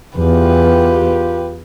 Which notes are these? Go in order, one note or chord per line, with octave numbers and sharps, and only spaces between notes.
E2 F4 G4 B4